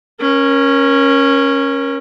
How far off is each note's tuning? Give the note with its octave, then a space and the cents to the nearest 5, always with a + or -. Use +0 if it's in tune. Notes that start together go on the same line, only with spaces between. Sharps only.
C#4 -10 A#4 +25